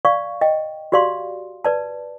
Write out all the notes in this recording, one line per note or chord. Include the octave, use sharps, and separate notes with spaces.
D5 F5 C#6
D#5 G5
F#4 G4 D5 F5 C6
B4 D5 A5